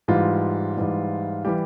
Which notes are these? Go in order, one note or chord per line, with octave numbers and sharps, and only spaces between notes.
G#2 E3 G3 F4
G#2 E3 G3
E3 G3 G4